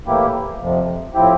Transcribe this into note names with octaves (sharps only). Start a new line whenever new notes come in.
A2 E3 A#3 E4 G4
F2 C3 F3
A2 F3 C4 E4 G4